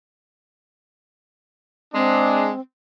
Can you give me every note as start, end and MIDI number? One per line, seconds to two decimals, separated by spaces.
1.94 2.50 56
1.94 2.60 60
1.94 2.50 62